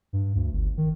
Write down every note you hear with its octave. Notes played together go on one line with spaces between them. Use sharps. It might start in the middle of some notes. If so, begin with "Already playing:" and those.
G2
D2
G1
D#3